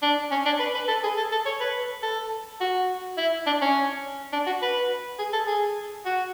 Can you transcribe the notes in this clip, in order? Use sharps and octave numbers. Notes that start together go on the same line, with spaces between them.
D4
C#4
D4
B4
B4
A4
G#4
A4
A4
C#5
B4
A4
F#4
E4
D4
C#4
D4
F#4
B4
G#4
A4
G#4
F#4